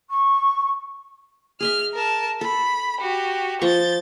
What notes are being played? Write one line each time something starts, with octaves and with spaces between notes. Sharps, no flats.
C#6
G#4 D#5 E5 F6
A#4 A5
A4 B5
F#4 G4
F3 A#5 C#6 G6 A6